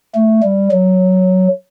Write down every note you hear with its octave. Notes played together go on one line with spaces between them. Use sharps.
A3
G3
F#3